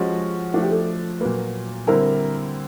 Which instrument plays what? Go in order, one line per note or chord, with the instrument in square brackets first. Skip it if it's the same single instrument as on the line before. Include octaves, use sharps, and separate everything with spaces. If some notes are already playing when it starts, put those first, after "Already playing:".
Already playing: [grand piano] F3 G#3 C#4 F#4 [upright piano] G4
[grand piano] F3 A3 D4 [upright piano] F#4
[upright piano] G4
A4
[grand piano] A#2 F#3 A#3 [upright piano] B4
[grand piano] D3 G3 C4 E4 [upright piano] A#4